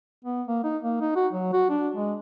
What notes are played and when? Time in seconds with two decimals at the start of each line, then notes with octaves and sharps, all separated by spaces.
0.25 B3
0.48 A#3
0.64 D#4
0.83 A#3
1.01 D#4
1.15 F#4
1.33 F#3
1.53 F#4
1.70 D4
1.94 G#3